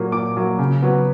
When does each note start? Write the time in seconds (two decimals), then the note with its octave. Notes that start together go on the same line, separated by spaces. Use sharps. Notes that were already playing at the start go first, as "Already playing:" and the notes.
Already playing: A#2 F#3 A#3
0.12 A#2 D6
0.37 F#3 A#3
0.59 C#3
0.82 F#3 B3